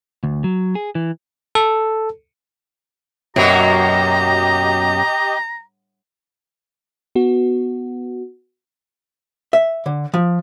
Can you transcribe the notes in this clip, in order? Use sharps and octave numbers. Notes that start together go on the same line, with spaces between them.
D2
F#3
G#4
E3
A4
F#2 B2 F#3 A#3 G4 D#5 A#5
B3 F#4
E5
D3
F3